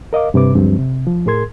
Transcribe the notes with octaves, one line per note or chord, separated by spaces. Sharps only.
A#4 D#5 F5 D6
G2 C3 B4 D6
D2 G2 F3 F#3 G#3 C4
C3
F3
A2 G#4 A#4 C6 G#6